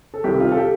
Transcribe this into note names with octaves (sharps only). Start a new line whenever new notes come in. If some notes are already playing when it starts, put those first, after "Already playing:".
A4
C2 C3 D#3 G4
F4
A4
G4